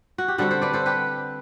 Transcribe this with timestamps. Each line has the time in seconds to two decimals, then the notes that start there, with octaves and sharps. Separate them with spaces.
0.18 F#4
0.28 G4
0.38 D3 G3 C4 F#4 A4
0.51 A4 C5
0.62 B4 D5
0.73 A4 C5
0.86 G4 B4